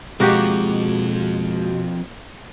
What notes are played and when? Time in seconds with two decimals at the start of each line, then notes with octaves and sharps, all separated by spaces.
0.20 B2 F3 G#3 A#3 C4 F#4 G4